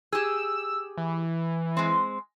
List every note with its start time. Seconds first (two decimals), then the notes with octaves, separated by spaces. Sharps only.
0.12 G4 G#4 E6
0.97 E3
1.77 G#3 C4